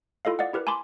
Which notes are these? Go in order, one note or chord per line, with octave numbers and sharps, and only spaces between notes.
E4 F4 A4 D#5 F5
D5 D#5 F5 F#5
E4 G4 A#4 B4
G#5 A5 B5 C6 D6